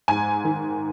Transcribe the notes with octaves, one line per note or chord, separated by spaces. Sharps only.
G#2 G#5
D#3